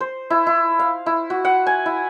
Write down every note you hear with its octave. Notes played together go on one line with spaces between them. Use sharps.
C5
E4
E4
F5
E4
F#4
F#5
G#5
E4